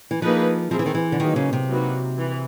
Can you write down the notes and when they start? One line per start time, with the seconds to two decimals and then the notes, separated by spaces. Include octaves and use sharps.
0.11 E3
0.22 F3 A#3 D#4 G#4 B4
0.70 F3 C4 E4 G#4
0.79 E3
0.86 D#3
0.95 E3
1.12 D3
1.20 D#3 F#3 A#3 D#4 G#4
1.36 C#3
1.53 C3
1.68 F#3 A#3 D#4 F#4 B4
2.17 E3